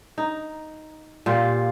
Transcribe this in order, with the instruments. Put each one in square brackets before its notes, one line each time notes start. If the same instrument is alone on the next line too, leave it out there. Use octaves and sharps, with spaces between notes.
[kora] D#4
A#2 F4 G4